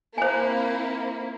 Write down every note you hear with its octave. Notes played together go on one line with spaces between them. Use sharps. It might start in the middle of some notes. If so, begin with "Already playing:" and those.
A#3 C4 E4 C5 G#5